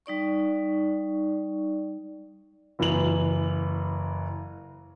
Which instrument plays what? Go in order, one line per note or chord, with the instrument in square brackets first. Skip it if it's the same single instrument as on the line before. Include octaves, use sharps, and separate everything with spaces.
[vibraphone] G3 D#4 D5 C#6
[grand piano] F#1 E3 F#7